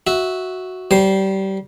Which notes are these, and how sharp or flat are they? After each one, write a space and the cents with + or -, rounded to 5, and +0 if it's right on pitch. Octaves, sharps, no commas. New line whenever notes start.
F#4 +0 E5 -10
G3 -25 C5 +0